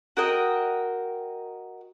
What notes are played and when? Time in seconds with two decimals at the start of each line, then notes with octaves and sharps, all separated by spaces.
0.17 F#4 A#4 D#5 G5